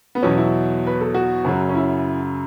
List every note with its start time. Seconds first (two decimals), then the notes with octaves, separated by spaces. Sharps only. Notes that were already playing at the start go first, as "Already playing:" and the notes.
0.15 B3
0.22 E2 B2 F#3 C#4
0.38 E4
0.87 B4
1.01 A4
1.14 F#4
1.44 F#2 C#3 F#3
1.69 C#4
1.75 E4